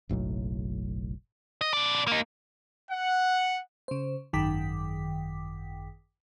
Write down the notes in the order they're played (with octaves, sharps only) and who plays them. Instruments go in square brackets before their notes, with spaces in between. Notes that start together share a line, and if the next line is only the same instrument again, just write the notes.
[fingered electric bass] F#1 B1 A2 F#3
[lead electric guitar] D#5
B2 D5
A#3 D#4
[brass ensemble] F#5
[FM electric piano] C#3 C5
G#1 F#2 D#3 G5 D6 B6